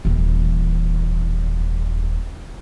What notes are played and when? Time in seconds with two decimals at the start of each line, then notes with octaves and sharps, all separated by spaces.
0.05 D#1 E3